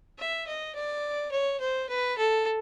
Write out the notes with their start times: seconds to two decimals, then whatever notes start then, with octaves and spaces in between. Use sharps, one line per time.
0.19 E5
0.47 D#5
0.75 D5
1.31 C#5
1.60 C5
1.89 B4
2.17 A4